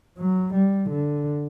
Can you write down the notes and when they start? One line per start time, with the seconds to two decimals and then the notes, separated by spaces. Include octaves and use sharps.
0.18 F#3
0.53 G3
0.90 D3